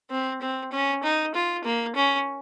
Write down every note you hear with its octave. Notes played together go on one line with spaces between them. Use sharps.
C4
C4
C#4
D#4
F4
A#3
C#4